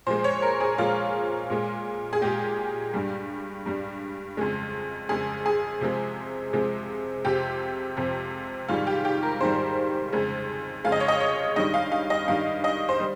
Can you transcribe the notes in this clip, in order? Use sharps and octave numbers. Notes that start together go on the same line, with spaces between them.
A#2 F3 G#3 C5
C#5
A#4
G#4
A#2 F3 G#3 F4
A#2 G#3
G#4
A#2 G#3 G4
G2 G3
G2 G3
F2 C#3 G#3
F2 C#3 G#3 G#4
G#4
C3 F3 G#3
C3 F3 G#3
F2 C3 F3 G4
F2 C3 F3
G#2 D#3 G3 F4
G4
G4
A#4
G#2 D#3 G3 C5
F2 C#3 G#3
F2 C#3 G#3 F5
D#5
C#5
D#5
C#5
G2 D#3 G3 D#5
F5
F5
D#5
G2 D#3 G3 F5
D#5
C5
G3